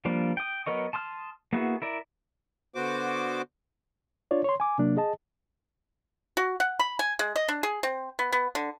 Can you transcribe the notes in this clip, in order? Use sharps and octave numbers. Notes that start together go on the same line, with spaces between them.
F3 G3 A#3 D4
G5 D#6
F#3 B3 A#4 D#5 C#6
A5 C6 D#6 F6
A#3 B3 E4 F#4 G#4
E4 A#4 D5
D3 B3 F#4 C5 D6
D4 F4 C#5 D5
C#5 C6
G#5 D6
C3 F#3 A#3 D4
G#4 D#5 A5
F#4
F#5
B5
G#5
G#3
D#5
D4
G#4
C4
B3
B3
D3